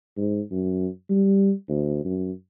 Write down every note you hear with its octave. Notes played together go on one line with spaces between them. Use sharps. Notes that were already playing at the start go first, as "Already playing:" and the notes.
G#2
F#2
G3
D2
F#2